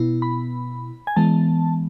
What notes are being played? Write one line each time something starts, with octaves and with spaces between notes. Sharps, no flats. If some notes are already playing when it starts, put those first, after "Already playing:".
Already playing: B2 B3 E4
B5
G#5
E3 G#3 B3 A5